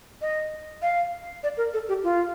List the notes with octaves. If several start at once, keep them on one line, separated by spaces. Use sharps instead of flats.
D#5
F5
D5
A#4
A4
G4
F4